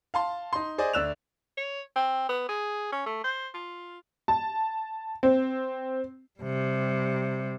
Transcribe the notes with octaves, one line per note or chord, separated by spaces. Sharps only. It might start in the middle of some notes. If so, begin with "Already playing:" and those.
F5 A5 C6
D#4 C6
G#4 C5 D5 D#5
D2 D4 E6 F#6 E7 F7
C#5
C4
B3
G#4
C#4
A3
C5
F4
A5
C4
C3 G3